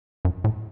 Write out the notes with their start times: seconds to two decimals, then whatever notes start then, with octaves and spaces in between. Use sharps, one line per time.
0.25 F#2
0.44 A2